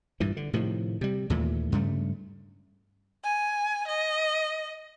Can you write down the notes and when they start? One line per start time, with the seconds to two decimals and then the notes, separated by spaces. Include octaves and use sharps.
0.20 G2 A#2 E3
0.37 D3
0.53 A2 C3 D#3 F3
1.01 C3 G3
1.30 D#2 A#2 E3 A3
1.72 G2 C#3 G3 A3
3.24 G#5
3.87 D#5